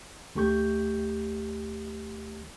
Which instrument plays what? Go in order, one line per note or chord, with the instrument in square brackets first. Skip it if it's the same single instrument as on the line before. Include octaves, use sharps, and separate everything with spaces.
[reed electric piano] D2 A3 G4 C#6 G6